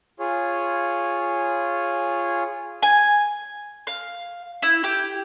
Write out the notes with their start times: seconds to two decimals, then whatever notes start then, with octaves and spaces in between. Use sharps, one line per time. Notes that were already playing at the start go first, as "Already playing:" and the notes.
0.19 F4 G#4 C#5
2.83 G#5
3.87 F5
4.62 E4
4.84 G4